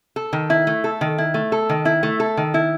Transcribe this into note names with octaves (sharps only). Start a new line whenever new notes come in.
A4
D#3
E4
A3
A4
D#3
E4
A3
A4
D#3
E4
A3
A4
D#3
E4